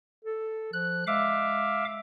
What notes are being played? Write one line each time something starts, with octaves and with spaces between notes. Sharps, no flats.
A4
F3 F#6
G#3 E5 F5 D6